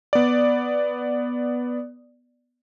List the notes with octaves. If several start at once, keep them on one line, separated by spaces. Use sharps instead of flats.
B3 D5